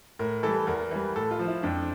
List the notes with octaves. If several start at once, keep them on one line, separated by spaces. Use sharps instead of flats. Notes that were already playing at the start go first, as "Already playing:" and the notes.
A2 A#4
E3 G3 A4
E2 A#4
E3 G3
A2 A4
F4
F3
E4
F2 D4